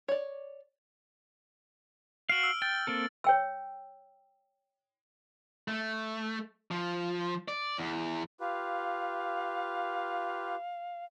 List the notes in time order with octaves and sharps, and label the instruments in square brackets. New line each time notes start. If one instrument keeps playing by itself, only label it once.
[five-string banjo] C#5 D5
[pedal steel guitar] F#4 F5 [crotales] F6 D7 F#7
[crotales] E6
[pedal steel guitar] G5 [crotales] A6
[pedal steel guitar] A#3 C4 A4
[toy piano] C#5 G5 E6
[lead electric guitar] A3
F3
D5
E2
[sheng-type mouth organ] F4 G4 B4 [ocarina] F5